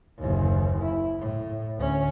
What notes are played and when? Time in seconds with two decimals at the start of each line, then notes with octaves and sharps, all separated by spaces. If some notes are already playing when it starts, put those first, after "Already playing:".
0.18 F#1 D#2
0.82 E4
1.19 A2
1.77 D2 C#4